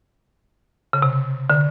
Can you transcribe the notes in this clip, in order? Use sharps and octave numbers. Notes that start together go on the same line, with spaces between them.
C#3
C3
D3